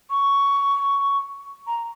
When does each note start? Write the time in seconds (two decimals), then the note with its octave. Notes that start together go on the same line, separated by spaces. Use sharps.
0.10 C#6
1.67 A#5